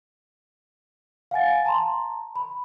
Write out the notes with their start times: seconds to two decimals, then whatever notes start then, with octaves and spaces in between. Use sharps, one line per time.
1.31 F5 F#5 G#5 A6
1.65 A5 A#5 C6
2.36 B5